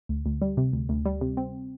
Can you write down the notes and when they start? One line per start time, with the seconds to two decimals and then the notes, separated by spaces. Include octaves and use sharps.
0.09 D2
0.26 D2
0.42 G3
0.57 C3
0.73 D2
0.89 D2
1.06 G3
1.21 C3
1.37 C4